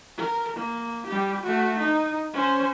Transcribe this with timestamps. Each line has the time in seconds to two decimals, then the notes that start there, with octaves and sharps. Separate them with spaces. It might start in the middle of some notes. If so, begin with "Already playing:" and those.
0.18 A#4
0.56 A#3
1.07 G3 G4
1.43 A3 F#4
1.79 D#4
2.33 C#4 C5